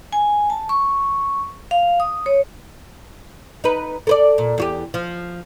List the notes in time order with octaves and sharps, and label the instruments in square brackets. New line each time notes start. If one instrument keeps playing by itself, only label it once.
[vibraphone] G#5
A5
C#6
F5
D#6
C#5
[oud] D#4 B4
A4 B4 D5
A#2
E2 F#4 G4
F3